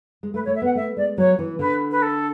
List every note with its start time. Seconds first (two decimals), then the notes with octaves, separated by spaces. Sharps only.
0.23 G#3
0.34 A3 B4
0.45 C#5
0.47 A3
0.55 E5
0.62 B3 F#5
0.75 A3 E5
0.96 G#3 D5
1.17 F#3 C#5
1.39 E3
1.59 D3 B4
1.91 B4
2.02 A4